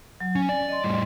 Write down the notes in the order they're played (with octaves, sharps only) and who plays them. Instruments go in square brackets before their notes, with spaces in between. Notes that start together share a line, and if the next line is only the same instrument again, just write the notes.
[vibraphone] F#3
[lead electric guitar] C#4 [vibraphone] G#5
[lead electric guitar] D5
[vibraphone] D#5 C6
[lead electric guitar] A2 G3